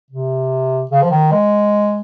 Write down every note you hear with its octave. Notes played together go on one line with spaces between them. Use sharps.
C3
C#3
F3
D#3
G#3